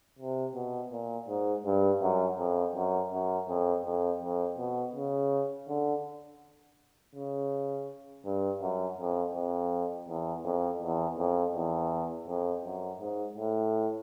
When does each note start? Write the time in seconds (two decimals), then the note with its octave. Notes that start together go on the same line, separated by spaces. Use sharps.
0.19 C3
0.55 B2
0.92 A#2
1.29 G#2
1.66 G2
2.02 F#2
2.39 F2
2.76 F#2
3.12 F#2
3.48 F2
3.85 F2
4.22 F2
4.58 B2
4.95 C#3
5.69 D3
7.15 C#3
8.25 G2
8.61 F#2
8.98 F2
9.34 F2
10.08 E2
10.44 F2
10.82 E2
11.19 F2
11.55 E2
12.28 F2
12.65 F#2
13.01 G#2
13.37 A2